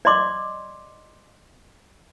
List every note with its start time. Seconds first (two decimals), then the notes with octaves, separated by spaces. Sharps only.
0.05 D5 D#5 C6 D6